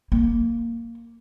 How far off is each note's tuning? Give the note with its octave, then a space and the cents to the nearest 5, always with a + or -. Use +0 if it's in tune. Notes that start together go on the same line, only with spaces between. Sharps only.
A#3 -10